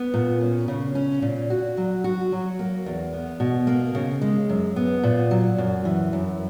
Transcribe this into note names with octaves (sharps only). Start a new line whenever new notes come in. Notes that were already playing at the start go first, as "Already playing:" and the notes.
Already playing: B3
A#2
C#4
C#3
C#4
A#2
F#4
F#3
F#4
F#3
A#3
E2
B3
B2
A#3
C#3
G#3
F#2
B3
A#2
F#3
F#2
E3
F#2